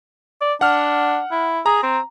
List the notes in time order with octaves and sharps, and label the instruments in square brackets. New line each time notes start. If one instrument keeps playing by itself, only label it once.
[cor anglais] D5
[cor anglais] D4 [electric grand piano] F#5 F6
[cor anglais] E4
[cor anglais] G#4 [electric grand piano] A#5
[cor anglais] C4